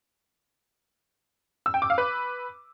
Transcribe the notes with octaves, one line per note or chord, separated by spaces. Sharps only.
E6
G5
D6
F5
B4